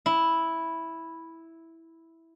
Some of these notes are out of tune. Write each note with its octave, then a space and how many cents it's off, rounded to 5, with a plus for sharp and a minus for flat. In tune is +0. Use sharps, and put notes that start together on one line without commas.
E4 -5